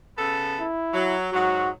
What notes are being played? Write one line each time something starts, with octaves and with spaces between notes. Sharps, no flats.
C#3 B3 A4
E4
F#3
G#2 F#3 F#4